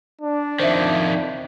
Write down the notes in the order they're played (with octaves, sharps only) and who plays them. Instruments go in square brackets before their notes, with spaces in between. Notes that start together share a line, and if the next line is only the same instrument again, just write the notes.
[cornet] D4
[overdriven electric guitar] F2 D#3 [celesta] C5 E5